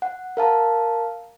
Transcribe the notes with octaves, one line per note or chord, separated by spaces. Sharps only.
F#5
A#4 F5 A5 A#5